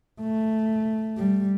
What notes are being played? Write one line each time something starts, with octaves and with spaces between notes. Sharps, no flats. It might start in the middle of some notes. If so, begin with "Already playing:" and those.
A3
G3